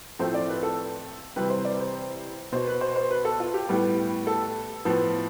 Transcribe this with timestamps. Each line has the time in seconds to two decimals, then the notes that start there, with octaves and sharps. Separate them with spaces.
0.19 A2 F3 A3 C4 C5
0.34 D5
0.49 B4
0.63 A4
1.36 C3 E3 G3 C4 B4
1.50 C5
1.65 D5
1.80 C5
2.52 B2 B3 C5
2.67 B4
2.81 C5
2.96 C5
3.11 B4
3.25 A4
3.40 F4
3.54 G4
3.69 A2 G3 B3
4.27 A4
4.85 A2 F3 B3